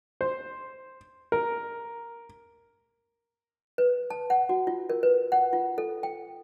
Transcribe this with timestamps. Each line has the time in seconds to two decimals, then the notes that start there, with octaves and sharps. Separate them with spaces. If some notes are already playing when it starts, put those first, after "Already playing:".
0.21 C5
1.32 A#4
3.78 B4
4.10 A5
4.30 F#5
4.49 F#4
4.67 F4
4.90 A#4
5.03 B4
5.32 F#5
5.53 F4
5.78 A4
6.03 G5